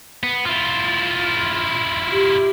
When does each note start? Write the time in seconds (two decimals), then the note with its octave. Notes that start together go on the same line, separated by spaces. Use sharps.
0.23 B3
0.46 E4 F4
2.12 G4